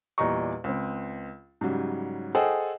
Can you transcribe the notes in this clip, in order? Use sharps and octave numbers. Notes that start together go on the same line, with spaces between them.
E2 A#2 G3 D#5 A#5 C#6
C#2 C4
G#2 C#3 F#3 G3
G#4 A4 C5 D#5 F#5 G5